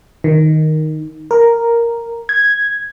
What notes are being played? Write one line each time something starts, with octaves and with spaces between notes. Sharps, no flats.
D#3
A#4
G#6